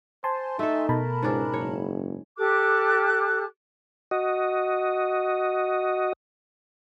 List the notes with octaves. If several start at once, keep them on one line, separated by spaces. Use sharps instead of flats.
C5 G#5 A5 C6
A3 D#4 A4 E5
B2 A#4 A5 B5
C#2 G#2 C#4 D4
F#1 C#5
G4 A4 D6 F#6
F#4 D#5